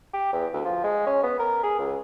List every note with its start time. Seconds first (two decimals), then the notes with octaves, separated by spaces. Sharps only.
0.13 G4
0.32 E2
0.53 D2
0.65 F3
0.83 G#3
1.06 C#4
1.23 B3
1.39 A#4
1.63 G#4
1.78 C#2